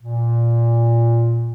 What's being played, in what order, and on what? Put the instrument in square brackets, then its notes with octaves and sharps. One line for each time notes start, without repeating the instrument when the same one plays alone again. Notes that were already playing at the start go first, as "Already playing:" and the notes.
[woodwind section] A#2